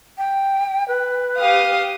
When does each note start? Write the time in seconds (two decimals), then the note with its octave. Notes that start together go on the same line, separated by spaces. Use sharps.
0.18 G5
0.88 B4
1.38 G4 F5 D#6